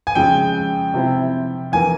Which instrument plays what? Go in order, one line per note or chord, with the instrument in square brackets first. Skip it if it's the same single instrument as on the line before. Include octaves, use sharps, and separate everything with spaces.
[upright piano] G#5
[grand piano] F2 C#3 F3 G#3 [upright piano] G5
[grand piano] C3 F3 C4 E4
[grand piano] F2 E3 A#3 [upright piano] G#5